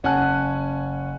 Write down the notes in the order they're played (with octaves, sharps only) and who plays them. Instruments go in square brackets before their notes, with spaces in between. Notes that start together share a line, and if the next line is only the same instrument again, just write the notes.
[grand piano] F#1 C#4 F#5 G#5 A5 F#6